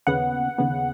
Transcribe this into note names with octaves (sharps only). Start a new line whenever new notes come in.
D#2 C#3 B3 F#5
D#2 C#3 B3